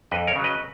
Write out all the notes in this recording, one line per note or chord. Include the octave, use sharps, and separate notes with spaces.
F2 B4 D#5
A#4 C#5
C#3 F#3
B4 D#5